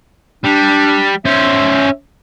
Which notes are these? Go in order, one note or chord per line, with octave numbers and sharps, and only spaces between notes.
G3 D4
C#4 C5 E5